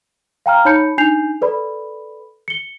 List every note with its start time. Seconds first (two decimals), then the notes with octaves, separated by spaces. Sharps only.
0.46 F5 G5 A#5 F6
0.65 D#4 C#5 A5 B5 G6 C#7
0.98 D4 D#4 G#5 G6 C7 F7
1.41 A4 B4 D5 B5
2.48 C#7 G7